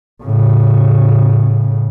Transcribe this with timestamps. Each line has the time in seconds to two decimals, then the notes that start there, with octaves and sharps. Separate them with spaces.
0.23 A2 C#3